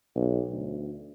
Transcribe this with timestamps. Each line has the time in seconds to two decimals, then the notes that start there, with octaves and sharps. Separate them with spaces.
0.16 B1
0.52 D2